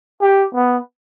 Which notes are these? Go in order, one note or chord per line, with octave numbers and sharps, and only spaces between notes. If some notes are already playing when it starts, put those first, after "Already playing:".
G4
B3